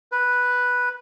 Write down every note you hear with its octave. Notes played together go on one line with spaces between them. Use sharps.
B4